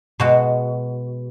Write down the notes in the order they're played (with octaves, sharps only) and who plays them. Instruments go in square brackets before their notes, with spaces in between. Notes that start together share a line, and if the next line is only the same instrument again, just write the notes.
[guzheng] B2 G#3 B3 F#4